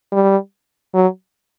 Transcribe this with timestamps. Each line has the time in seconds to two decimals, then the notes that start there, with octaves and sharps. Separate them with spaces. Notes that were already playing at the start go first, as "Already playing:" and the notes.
0.12 G3
0.94 F#3